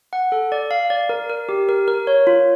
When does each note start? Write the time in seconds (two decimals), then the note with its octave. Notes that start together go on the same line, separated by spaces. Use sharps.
0.13 F#5
0.32 A4
0.52 D5
0.71 F5
0.90 D5
1.09 A#4
1.29 A#4
1.49 G4
1.69 A#4
1.88 A#4
2.07 C#5
2.27 F4